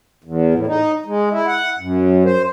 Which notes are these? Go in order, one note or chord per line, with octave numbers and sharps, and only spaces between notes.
E2
A2
D#4
G#3
E4
F#5
F#2
C5